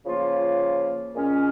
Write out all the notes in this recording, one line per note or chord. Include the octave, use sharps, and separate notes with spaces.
C#3 F3 A#3 F4
A#2 G#3 C#4